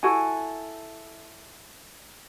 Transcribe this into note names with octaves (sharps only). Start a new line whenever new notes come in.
E4 F#4 A4 G#5